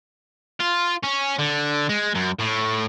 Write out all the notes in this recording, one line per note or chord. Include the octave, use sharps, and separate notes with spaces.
F4
C#4
D3
G#3
F#2
A2